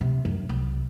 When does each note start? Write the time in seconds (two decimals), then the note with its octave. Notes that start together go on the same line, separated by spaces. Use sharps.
0.01 C3
0.25 F#2
0.49 C2